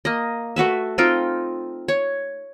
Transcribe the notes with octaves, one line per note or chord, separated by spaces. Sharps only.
A#3 D#5
A3 F#4 B4 E5
C4 D#4 F4 G5
C#5